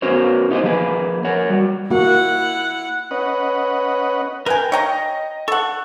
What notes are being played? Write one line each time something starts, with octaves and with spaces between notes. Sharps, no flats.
B3 C#4 F#4 A#4 C5 C#5
D#4 F4 G4 A4 C5 D#5
F3 A#3 G#4 B4
A#4 C#5 F#5
G3 F#4
A#3 E4 F#4 F#5
C#4 B4 D#5 F#5
A#4 B4 G5 G#5
C#5 D#5 G5 A#5
A4 F#5 C#6